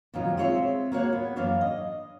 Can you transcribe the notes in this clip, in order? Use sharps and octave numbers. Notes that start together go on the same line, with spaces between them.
F2 A#2 D#3 F3 F#3 D#4
G#3 C4 F4 C#5 D5 E5
A#3 F#4 C#5 F#5
B3
F#2 E3 A#3 D4 C#5 F5
D#5